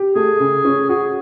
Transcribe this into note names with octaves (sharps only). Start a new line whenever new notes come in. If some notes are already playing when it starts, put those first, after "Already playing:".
Already playing: G4
A3 G#4
C#3
C#4
F#4 G#4